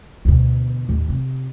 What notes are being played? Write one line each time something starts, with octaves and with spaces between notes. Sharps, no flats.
D2 B2
D#2 A2
C3